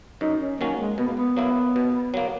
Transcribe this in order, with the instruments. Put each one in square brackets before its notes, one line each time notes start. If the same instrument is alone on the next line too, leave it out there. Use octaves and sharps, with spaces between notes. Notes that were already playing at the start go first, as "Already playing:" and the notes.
[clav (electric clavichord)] F#2 [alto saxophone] D#4
[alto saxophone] C#4
[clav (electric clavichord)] D#3 F#3 C#4 [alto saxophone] A#3
[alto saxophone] G#3
[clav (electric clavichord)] B2 [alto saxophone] B3
[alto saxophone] A#3
B3
[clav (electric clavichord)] F#3 A#3 E4
B2
F#3 A#3